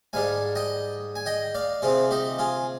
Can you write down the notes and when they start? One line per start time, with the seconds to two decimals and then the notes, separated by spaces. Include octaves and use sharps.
0.13 G#2 G3 D4 F5 G#5
0.55 D#5 G5
1.16 G#5
1.26 D#5 G5
1.55 D5 F5
1.82 C3 F3 C4 F4 G#4
2.11 D#4 G4
2.39 F4 G#4